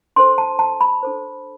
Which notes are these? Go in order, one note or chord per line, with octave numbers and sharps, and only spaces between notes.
D4 A4 C5 C6
A5
A5
B5
D4 A4 C5